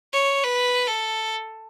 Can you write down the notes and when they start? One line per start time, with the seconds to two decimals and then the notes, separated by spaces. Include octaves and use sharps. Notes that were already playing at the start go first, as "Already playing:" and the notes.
0.13 C#5
0.44 B4
0.87 A4